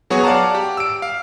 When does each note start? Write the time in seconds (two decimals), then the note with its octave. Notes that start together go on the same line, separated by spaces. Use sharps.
0.10 F#3 B3 F#4 G#4 C#5
0.24 D5 F5 F#5 A5 A#5
0.54 G4
0.77 E6 D7
1.02 F5